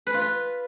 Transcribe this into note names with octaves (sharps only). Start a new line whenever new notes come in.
B4
F4
B4